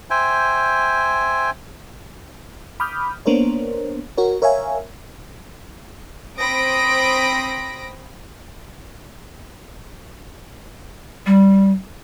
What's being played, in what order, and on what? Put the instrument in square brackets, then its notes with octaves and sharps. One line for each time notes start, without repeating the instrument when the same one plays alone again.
[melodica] C5 E5 G5 G#5
[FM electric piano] B5 D6 D#6 F6 G6
A#3 B3 D4 A#4 C5 C#5
F#4 A#4 C#5
A#4 C#5 E5 F5 G#5
[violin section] C4 B5 D#6 A#6 D7
[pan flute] G3